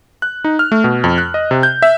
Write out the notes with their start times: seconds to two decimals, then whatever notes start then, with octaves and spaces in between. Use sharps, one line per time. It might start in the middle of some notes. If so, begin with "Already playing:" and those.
0.22 F#6
0.44 D#4
0.59 F6
0.72 A3
0.84 B2
1.04 F2
1.18 F#6
1.34 D#5
1.51 C3
1.63 G6
1.82 E5